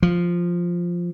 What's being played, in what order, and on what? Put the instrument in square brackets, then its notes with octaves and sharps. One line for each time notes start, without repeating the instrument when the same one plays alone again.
[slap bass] F3